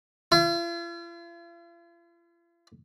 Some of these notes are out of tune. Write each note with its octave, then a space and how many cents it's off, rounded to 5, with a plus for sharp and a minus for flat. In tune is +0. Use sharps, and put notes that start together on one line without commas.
F4 -45